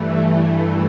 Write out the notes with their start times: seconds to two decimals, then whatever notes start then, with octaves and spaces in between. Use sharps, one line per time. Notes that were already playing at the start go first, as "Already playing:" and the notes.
Already playing: G2 E3 A3
0.19 A3